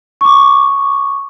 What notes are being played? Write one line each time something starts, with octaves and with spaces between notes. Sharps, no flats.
C#6 D6